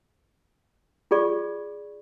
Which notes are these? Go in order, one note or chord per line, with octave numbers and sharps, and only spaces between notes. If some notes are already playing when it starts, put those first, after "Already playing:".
F4 G#4 D5 C#6